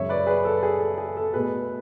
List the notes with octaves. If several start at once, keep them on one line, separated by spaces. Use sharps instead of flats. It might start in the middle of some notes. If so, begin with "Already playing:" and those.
Already playing: F#2 C#3 G#3 C#5 E5
B4 D5
G#4 B4
A4
G#4
A4
G#4
A4
B2 A3 G#4 B4